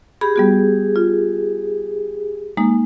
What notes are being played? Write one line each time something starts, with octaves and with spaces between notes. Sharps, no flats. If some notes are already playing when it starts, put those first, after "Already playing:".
G4 G#4 B5
G3 B3 F#4
F4
G#3 A#3 D#4